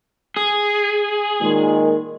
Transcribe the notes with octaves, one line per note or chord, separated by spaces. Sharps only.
G#4
A#2 D#3 G#3